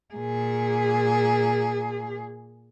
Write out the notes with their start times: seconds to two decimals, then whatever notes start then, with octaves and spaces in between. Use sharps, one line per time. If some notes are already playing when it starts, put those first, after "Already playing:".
0.14 A#2 G#4